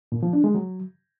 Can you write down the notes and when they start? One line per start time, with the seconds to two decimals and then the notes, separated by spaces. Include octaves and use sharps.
0.12 A#2
0.23 F3
0.33 D4
0.44 G#3
0.55 F#3